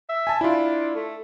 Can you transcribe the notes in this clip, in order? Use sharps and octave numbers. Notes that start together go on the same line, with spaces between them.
E5
G#5 A5
D4 E4 F4
A3